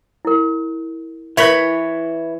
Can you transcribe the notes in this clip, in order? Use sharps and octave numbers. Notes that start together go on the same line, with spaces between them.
E4 A#4
E3 E4 A#4 B4 C#5 E5 B5